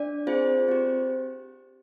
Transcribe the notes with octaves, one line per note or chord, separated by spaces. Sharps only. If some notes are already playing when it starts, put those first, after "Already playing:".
Already playing: D4 D5
C4 F4 G#4 C5
C4 G4